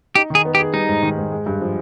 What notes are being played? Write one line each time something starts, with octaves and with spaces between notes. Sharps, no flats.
D#4 G4
D#3 G#4
B3
G4
G#4
G3 D#4
G#2
D#3
G#2
G#3
G2
F3